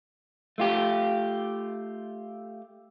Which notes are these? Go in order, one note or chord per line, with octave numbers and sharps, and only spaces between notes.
A3 F4 G4